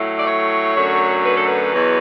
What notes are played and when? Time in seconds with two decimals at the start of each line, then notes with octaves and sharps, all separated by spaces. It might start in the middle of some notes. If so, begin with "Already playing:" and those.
Already playing: A2 F#3 A3
0.19 D5
0.26 C#5
0.75 F#2 D3 F#3 A3
1.24 B4
1.34 A4
1.46 B4
1.74 E2 B2 F#3